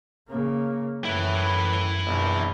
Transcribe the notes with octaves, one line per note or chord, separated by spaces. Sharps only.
C#3 A#3
F#2 A2 E4 B4
A#1 F#2 B2